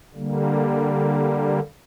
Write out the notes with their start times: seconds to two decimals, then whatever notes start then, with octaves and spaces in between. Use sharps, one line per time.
0.14 D3 G3 A#3